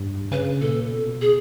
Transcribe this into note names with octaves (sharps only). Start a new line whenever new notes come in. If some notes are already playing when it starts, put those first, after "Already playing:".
Already playing: G2
C#3 B4
A#2 A4
B2
G#4